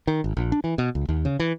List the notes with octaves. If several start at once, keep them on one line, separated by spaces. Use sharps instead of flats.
D#3
G#1
A#1
D4
E3
B2
C#2
D#2
C#3
E3